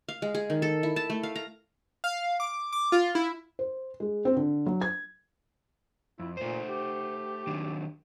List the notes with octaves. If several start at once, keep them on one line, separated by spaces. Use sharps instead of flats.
F5
G#3
G#4
D#3
A4
E4
A5
A3
F5
A#5
F5
D6
D6
F4
E4
C5
G#3
C4
D3
F#3
G#6
F2 E4
A#2 A3 C5
G4
D#3 F#3 D4